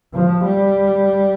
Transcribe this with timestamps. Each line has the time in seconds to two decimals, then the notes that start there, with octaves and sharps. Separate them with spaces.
0.14 F3
0.44 G3